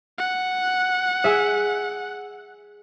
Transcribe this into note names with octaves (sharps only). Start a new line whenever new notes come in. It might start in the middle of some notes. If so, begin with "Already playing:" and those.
F#5
G#4 E5